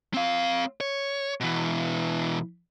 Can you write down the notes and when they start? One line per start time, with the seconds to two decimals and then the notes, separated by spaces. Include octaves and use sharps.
0.14 C4 F5
0.81 C#5
1.41 B2 E3